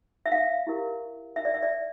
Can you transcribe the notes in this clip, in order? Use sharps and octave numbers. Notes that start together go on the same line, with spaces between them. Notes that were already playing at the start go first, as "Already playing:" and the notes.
E5
F5
E4 G4 A#4
E5
D5
E5
D5